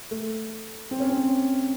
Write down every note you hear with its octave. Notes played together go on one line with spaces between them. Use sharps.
A3
C4
C#4
C4